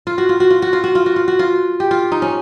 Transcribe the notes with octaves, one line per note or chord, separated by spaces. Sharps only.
F4
F#4
F4
F#4
F4
F#4
F4
F#4
F4
F#4
F4
F#4
F4
G4
F4
D#4
C#4